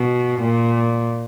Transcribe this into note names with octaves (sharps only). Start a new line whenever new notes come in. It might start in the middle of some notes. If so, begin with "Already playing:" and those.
Already playing: B2
A#2